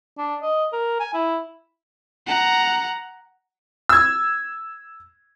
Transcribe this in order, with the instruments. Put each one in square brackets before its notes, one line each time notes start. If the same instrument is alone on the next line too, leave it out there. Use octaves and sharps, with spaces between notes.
[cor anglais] D4
D#5
A#4
G#5
E4
[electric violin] F#5 A#5
[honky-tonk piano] E6 G#6